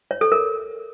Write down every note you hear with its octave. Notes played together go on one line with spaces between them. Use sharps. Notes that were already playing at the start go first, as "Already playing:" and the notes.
C#5
A4
A#4